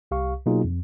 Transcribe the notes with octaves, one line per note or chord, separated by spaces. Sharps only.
C2 G4 F5 C#6
B2 F#3 A#3 D#4 F4 G#4
F2